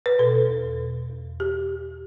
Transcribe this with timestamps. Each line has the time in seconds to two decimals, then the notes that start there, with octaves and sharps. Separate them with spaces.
0.06 B4
0.19 B2 A4
0.49 E2
0.80 B2
1.10 E2
1.40 G4